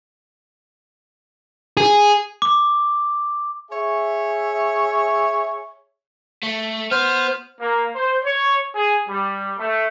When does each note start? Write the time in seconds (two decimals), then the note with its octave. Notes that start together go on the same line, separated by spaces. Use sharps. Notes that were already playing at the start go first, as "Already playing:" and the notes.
1.77 G#4
2.42 D6
3.71 G#4 C#5 E5
6.43 A3
6.91 B3 C5 F6
7.61 A#3
7.95 C5
8.25 C#5
8.74 G#4
9.08 G3
9.58 A3